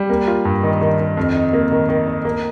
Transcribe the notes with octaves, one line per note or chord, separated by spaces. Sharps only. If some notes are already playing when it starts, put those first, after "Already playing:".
Already playing: G3
A#3
F4
G2
D#3
D#3
D#3
F2
D#4
A#3
D#3
D#3
D#4
A#3